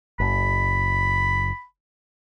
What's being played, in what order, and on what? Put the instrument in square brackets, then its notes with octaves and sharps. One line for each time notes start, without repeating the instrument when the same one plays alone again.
[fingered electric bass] F#1 [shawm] B5